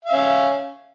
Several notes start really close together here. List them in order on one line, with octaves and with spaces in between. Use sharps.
F5 E5 C#4